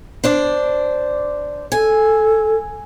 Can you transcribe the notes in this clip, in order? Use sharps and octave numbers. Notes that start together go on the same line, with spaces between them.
D4 C5 D5
A4 G#5